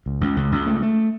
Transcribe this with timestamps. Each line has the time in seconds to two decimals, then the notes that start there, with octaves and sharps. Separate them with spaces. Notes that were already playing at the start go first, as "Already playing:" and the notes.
0.06 C#2
0.21 C#2
0.36 C#2
0.52 C#2
0.67 A3
0.82 A3